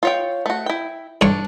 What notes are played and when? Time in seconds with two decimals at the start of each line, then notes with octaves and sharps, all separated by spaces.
0.03 F4 C#5 G5
0.46 A3 F#4
0.66 E4 G5
1.21 G2 D4 C#5